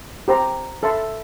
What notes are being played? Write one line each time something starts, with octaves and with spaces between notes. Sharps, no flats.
G4 C5 G5 A#5
A4 E5 A5 C6